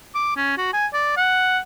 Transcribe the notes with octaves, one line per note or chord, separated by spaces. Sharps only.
D6
C#4
F#4
G#5
D5
F#5